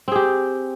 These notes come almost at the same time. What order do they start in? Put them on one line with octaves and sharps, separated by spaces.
C4 G#4 G4